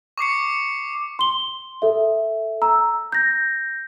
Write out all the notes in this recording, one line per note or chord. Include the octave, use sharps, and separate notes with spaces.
C#6 D6 C7 C#7
C6 G7
A4 E5
A#5 E6
G6 A#6